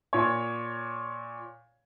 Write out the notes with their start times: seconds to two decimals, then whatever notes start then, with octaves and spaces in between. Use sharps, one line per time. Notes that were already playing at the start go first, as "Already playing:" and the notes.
0.13 A#2 C#5